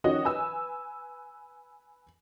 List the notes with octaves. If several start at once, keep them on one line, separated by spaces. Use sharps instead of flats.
D#3 C#4 F#4 D#5
B4 G#5 E6